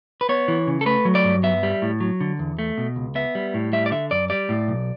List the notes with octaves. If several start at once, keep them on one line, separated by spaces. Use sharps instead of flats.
B4
B3 C#5
E3
C#3
A4
A3 B4
F#3
D5
G2
B3 E5
G3
A2
F#3
D3
E2
A3
B2
C#2
B3 E5
G3
A2
G3 E5
D5
D3 E5
F#2 D5
G3 D5
A2
B1